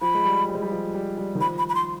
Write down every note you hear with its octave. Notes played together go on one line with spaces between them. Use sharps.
F3 B5
G#3
G3
G3
G#3
G3
F3
G3
G3
D#3
F3 B5
B5
B5
C6